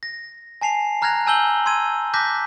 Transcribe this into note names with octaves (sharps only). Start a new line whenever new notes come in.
A#6
G#5 A5 C7 F7
A#5 F6 F#6 G#6 A#6 F7
G#5 A5 E6 G6 F#7 G7
C6 E6 G#6 D#7
A5 D6 F#6 G6 A#6 B6